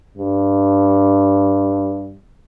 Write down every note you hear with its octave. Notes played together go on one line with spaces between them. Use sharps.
G2